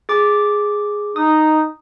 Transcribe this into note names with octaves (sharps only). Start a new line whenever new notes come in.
G#4 D6
D#4 D#6